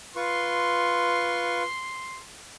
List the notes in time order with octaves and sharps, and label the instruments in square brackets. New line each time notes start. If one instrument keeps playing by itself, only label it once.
[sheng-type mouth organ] F4 B4 C#6 [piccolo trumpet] C6